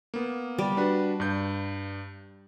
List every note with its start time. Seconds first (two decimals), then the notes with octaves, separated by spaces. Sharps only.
0.14 A#3 B3
0.58 G3
0.77 D4 F#4 B4
1.20 G2 G6